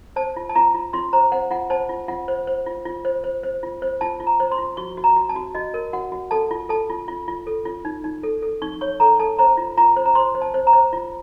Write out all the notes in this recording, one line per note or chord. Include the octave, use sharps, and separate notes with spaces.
C5 A5
F4
A5
F4 A#5
F4
F4 C6
C5 A#5
C5 F#5
F4 F#5
C5 A5
F4
F4 F#5
C5
C5
F4
F4
C5
C5
C5
F4
C5
F4 A5
F4
A#5
C5
C6
F4
F#4 C#6
F#4
A#5
F#4
A5
F#4
F#4 D#5
A#4
F#4 F#5
F#4
A4 A5
F4
A4 A5
F4
F4
F4
A4
F4
D#4
D#4
A4
A4
D#4 C#6
C#5 C#6
A4 A#5
A4 A5
C5 A#5
F4
F4 A#5
C5
A#5
C5 C6
C5
A5
C5
A#5
C5
F4